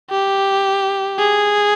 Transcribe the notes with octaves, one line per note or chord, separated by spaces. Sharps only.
G4
G#4